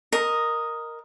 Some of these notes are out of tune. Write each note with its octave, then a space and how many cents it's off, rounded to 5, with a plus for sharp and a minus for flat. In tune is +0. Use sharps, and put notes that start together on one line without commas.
A#4 +0 D#5 +0